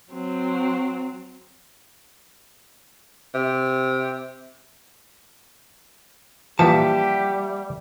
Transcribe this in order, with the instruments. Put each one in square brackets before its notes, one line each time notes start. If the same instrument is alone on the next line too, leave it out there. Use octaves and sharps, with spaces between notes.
[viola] F#3 C4
[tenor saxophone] C3
[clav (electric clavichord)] A#2 E3 F3 [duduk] G3 [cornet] G4 [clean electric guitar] E5 F#5 A5